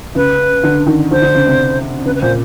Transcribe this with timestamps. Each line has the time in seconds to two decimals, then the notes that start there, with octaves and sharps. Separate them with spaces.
0.15 C#3 B4
0.63 D3
0.87 D#3
1.11 D3 C5
1.22 D3
1.35 C#3
1.46 C3
2.05 C#3 B4
2.15 B4
2.21 A#2 C5